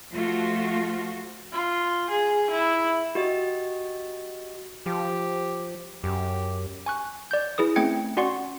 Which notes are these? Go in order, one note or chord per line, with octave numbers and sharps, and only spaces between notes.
F3 A3 F4 F#4
F4
G#4
E4
F#4 G4 D#5
F3 G4
F#2 G4
G#5 C#6 F#6
D5 G6
E4 G#4 B4 D#6
A3 C4 C#4 G5 G#6 C#7
C#4 F#4 D5 F#5 C6 C#6